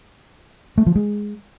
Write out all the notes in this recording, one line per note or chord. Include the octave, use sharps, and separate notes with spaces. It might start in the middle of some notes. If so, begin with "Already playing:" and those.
A3
F3
G#3